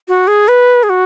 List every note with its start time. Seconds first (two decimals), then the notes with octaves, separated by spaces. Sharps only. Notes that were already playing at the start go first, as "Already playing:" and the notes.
0.08 F#4
0.27 G#4
0.48 B4
0.83 G#4
0.89 F#4